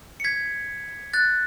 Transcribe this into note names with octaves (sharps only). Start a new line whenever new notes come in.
C#7
G#6 B6
F#6 A6